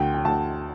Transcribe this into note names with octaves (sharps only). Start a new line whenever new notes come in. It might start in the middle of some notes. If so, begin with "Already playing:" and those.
Already playing: D2 G5
G5
D2 A5